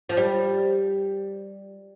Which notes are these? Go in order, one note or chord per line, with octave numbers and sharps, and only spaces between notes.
F3
G3